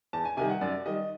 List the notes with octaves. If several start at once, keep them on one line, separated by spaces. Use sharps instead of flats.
E2 A5
G#5
C3 D#3 G3 G#5
F#5
F#2 D5
D#3 G3 D#5